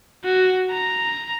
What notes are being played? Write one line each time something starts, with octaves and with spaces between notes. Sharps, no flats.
F#4
A#5